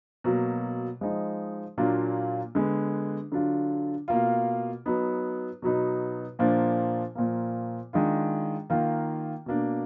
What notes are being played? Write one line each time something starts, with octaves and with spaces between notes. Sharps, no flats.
B2 F#3 A#3
F3 G#3 D#4
A#2 F#3 A#3 D4 F4
D3 G#3 B3
D3 F#3 D4 F4
B2 A#3 F4
F#3 B3 D#4
B2 F#3 B3 D#4
A#2 F3 A#3 D4
A#2 F3 A#3
D#3 G#3 D4 F4
D#3 A#3 F4
B2 A#3 D4